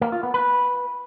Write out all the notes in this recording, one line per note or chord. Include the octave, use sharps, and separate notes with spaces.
A#3
F4
B3
B4